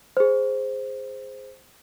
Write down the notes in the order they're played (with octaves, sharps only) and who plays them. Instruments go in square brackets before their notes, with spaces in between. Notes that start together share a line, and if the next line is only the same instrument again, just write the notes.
[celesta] G#4 C5